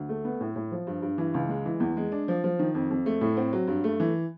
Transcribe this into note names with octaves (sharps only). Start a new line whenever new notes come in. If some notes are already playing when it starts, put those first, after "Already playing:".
Already playing: D2
A3
B3
A2
A2
F3
G2
G2
E3
C#2
G#3
E3
E2
G#3
D4
F3
F3
D#3
F2
F2
A3
A2
C4
F#3
G2
A3
E3